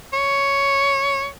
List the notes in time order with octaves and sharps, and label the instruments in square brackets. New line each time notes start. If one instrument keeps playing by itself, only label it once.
[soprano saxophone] C#5